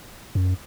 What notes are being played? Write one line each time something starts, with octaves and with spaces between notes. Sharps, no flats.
F#2